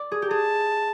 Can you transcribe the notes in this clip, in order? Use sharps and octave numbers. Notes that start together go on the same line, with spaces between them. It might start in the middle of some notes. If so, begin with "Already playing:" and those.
Already playing: D5
G#4
G4
G#4 A5